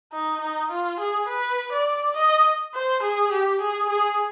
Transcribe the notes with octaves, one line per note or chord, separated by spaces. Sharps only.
D#4
D#4
F4
G#4
B4
D5
D#5
C5
G#4
G4
G#4
G#4